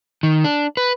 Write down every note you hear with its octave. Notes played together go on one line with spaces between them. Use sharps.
D#3
D4
B4